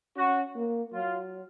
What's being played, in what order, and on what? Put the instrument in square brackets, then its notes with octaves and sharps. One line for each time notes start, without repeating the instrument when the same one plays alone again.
[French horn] C#4 [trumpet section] F#4
[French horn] A#3
[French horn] F#3 [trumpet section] F4